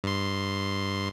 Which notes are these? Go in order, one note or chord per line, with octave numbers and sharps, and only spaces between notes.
G2 C6